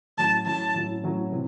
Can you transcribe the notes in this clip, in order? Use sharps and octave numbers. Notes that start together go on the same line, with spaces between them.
A2 F#3 C#4 E4 A5
A2 F#3 C#4 E4 A5
A2 F#3 C#4 E4
A2 F#3 C#4 E4
C3 E3